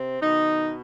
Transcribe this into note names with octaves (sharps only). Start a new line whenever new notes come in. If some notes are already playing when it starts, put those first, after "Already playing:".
Already playing: C3 C4
B2 D#3 D#4